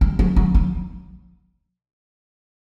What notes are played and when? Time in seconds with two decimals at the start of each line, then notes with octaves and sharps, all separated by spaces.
0.01 G3
0.19 F#3
0.36 F#3
0.55 F#3